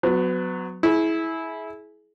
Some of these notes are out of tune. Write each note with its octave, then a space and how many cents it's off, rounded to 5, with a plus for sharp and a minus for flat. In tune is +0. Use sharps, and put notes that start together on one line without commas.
F#3 -10 B3 +30
E4 -15 G#4 +30